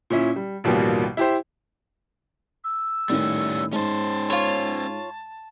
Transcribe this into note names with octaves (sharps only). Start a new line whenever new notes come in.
A#2 C#4 E4
G3
A1 D#2 B2 F3 G3 A#3
E4 G4 C5
E6
A2 D#3 G3 C#4
G#2 C#4 C5 A5
F4 C#5